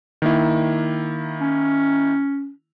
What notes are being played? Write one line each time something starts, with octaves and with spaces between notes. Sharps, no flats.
D#3 A#3 E4
C#4